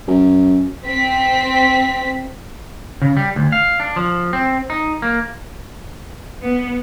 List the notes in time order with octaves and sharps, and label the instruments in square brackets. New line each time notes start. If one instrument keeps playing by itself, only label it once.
[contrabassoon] F#2
[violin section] C4 B6
[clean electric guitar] C#3
G3
D2
F5
D4
F3
C4
D#4
A#3
[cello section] B3